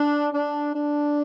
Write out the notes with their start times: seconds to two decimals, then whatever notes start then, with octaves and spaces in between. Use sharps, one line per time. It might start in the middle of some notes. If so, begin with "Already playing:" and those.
Already playing: D4
0.32 D4
0.74 D4